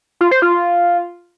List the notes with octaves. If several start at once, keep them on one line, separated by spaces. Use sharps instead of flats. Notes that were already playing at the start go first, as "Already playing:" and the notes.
F4
C5
F4